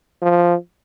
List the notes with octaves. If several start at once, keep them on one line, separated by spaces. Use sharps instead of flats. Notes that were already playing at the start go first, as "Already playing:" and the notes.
F3